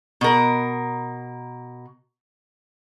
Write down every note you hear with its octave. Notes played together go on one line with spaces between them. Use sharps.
B2 A#4